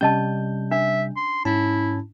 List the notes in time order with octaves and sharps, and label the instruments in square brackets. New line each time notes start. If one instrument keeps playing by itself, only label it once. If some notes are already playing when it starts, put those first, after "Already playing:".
[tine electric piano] C3 G3 G6 [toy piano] C#4 D#5 A5
[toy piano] D4 [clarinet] E5
[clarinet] C6
[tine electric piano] G#2 C#4 A5 [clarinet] E4